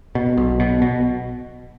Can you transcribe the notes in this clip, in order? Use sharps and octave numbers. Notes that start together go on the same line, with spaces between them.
B2
B1
B2
B2